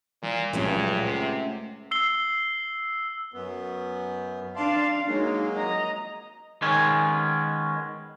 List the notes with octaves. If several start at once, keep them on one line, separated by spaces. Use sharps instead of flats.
A#2 E3 G3
C#2 G2 A#2 F3 F#3 A3 C#4 D#5
C3 F#5 C7
E6 C7 G7
F#2 B3
D4 D5 F5 A5 C6
F#3 G#3 A#3 D#4
D#5 A#5
D#3 G#3 B3 C#4